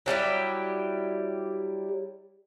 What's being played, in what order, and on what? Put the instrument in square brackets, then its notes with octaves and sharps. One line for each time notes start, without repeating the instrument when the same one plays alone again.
[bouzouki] F#3 G3 E4 G4